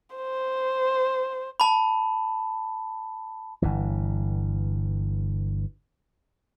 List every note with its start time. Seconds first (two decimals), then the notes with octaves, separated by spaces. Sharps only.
0.16 C5
1.60 A5 B5
3.62 G1 G2 E3